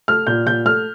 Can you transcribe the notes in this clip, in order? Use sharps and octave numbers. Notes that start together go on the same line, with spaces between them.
A3 F6
A#2 G6
A#2 G6
A3 F6